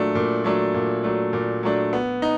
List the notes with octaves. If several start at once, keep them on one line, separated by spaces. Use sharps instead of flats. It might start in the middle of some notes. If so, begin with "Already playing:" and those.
Already playing: A#2 F#3 A3 D4
A#2
F#3 A3 D4
A#2
F#3 A3 D4
A#2
F#3 A3 D4
B3
D#4